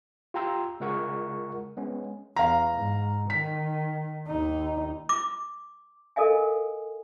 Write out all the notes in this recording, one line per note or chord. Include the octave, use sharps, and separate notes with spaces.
F4 G4 G5 A#5 C6 E6
C#3 G#3 F4 A#4 F#5 C#6
G#3 B3 C#4
E2 F5 A#5
G#2
D#3 B6
D#2 D#4
D6
A4 A#4 D#5 F5 G#5